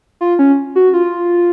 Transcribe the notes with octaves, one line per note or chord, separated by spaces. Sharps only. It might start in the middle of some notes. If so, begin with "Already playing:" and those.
F4
C#4
F#4
F4